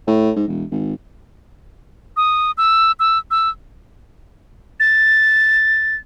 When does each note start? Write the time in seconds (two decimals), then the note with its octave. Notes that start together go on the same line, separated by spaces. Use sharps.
0.07 A2
0.36 G#2
0.47 E1
0.71 G#1
2.17 D#6
2.58 E6
3.00 E6
3.31 E6
4.80 A6